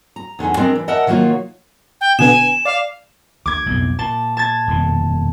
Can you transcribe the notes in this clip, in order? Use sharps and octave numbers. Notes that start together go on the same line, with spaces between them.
A#5
E2 D3 D#4 G#5
G#3 C4 D4 A#4
E3
A#4 D#5 E5 F#5 A5
C3 D#3 F#3 A#3 F4 C#5
G5
B2 D3 B3 G#5 E7
D5 F5
D2 D6 G#6
B1 F2 A2
A#2 A5
A5 G#6 A6
D#1 F2 B2